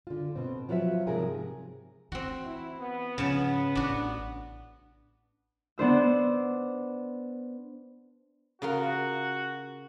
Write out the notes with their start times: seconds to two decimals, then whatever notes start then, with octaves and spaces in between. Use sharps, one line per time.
0.07 D3 F4
0.35 B2 C4
0.69 F3 F#3 F4 B4 E5
1.07 G#2 C3 F3 G#4 A#4 G#5
2.12 E3 C4 F#4
2.45 E4
2.78 B3
3.18 G#2 C#3 F3 B3 C#5 A5
3.75 A1 D4 F#4
5.78 B3 D4 C5 E6
8.62 C#3 F4 F#4 A#4